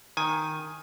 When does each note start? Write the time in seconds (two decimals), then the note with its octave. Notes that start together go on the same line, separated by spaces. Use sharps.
0.17 D#3 G#5